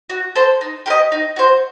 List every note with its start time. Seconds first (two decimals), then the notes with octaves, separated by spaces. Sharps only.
0.10 F#4
0.35 A4 C5
0.61 D#4
0.86 G4 A#4
0.90 D#5
1.12 D#4
1.36 F#4 C5